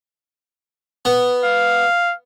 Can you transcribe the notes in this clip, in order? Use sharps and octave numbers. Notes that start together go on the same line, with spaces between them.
B3
F5